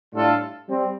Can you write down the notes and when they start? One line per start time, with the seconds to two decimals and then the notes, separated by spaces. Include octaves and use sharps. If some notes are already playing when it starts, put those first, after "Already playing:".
0.13 A2 G3 D4 F4 A4
0.67 G3 C4